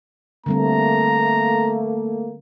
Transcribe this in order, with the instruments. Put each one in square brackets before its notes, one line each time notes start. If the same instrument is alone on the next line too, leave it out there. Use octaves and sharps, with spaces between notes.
[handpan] D3 G3 C4 [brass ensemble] A3 A#3 [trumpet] A#5